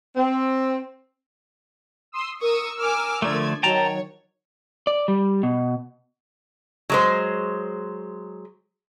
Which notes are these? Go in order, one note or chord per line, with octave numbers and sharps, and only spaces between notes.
C4
C6 D#6 E6
A#4 C#6 D#6 E6
G#5 D6 F6
D3 F3 A3 D5 G#6
D#3 F#3 C#5 G5 A5 A#5
D5
G3
B2
F#3 G#3 C5